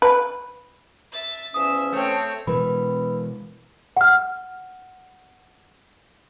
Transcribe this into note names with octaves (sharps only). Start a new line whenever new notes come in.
B4
E5 A6
E2 F3 C#4 E5 D#6 E6
A3 C4 C#5
B2 E3 G#3 A#4 B4 B5
F#5 F6